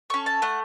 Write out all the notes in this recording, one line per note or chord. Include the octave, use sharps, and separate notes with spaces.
C#4 A4 C#6
A5
A3 F#5